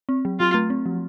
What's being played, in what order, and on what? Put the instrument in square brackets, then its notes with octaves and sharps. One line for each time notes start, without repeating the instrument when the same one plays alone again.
[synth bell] C4
F#3
[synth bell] F#3 [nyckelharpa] F4
[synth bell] A3
C4
F3